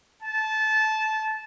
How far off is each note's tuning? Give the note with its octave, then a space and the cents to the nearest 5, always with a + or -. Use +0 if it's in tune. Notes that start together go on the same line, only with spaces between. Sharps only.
A5 -20